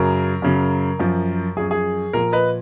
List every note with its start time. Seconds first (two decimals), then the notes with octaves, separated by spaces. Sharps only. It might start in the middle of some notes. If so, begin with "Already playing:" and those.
Already playing: F#2 C#3 F#3 A#4
0.42 F#2 C#3 F#3
0.99 F#2 F3
1.57 F3 G#4
1.59 F#2
1.71 G#4
2.13 A#2 F3 A#4
2.32 B4 D#5